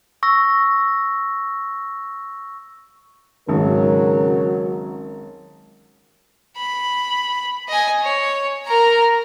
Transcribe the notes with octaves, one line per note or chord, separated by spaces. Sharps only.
C#6 E6 A#6
G#1 C#3 F#3 A#4
B5
D#5 G#5
C#5
A#4 A#5